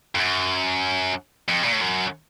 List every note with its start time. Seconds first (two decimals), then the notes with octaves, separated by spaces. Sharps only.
0.15 F2
0.19 F#2
1.49 F2
1.63 A#2
1.73 A2
1.81 F#2